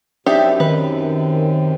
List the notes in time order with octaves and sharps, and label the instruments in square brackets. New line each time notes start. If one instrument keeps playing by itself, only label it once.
[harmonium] F#2 C3 [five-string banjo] D4 D#4 G4 [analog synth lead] E5
[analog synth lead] D#3 [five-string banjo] B4